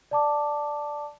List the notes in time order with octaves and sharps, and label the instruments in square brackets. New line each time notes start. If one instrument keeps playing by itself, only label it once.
[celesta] D5 A5 D6